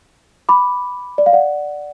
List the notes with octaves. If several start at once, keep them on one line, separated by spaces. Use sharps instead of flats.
B5 D6
D5
F5
D5 F#5